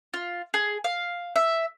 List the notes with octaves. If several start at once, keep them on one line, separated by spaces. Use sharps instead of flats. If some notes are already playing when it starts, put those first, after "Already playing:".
F4
G#4
F5
E5